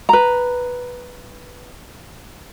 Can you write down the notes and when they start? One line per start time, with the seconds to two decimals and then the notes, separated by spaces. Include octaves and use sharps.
0.09 B4 A#5